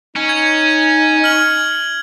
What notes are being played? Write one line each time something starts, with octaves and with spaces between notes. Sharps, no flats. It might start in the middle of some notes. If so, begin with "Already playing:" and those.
C#4 D#4
G#6
F6 F#7